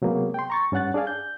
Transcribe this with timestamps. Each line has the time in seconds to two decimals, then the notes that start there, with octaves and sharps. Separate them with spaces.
0.02 C3 F#3 G#3 A#3 B3 G#4
0.34 G5 C6
0.50 A#5 C#6 A6
0.72 G2 C#4 D4 F#5 F#6 A6
0.94 D4 G#4 D5 F5 G#5
1.07 G6